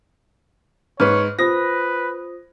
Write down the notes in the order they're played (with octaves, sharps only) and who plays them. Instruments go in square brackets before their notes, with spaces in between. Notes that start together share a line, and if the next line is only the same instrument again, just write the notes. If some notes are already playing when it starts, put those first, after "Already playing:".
[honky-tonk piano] G#2 B4 [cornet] C#5 [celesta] F6
[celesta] F4 C5 D#6 [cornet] B4 [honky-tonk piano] A#6